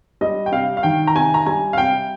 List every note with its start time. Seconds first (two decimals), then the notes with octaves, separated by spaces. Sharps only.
0.21 G3 D#5
0.46 G5
0.52 C3 F5
0.77 F5
0.83 D#3 G5
1.07 A#5
1.15 C3 G#5
1.34 A#5
1.46 G3 G#5
1.73 F5
1.78 C3 G5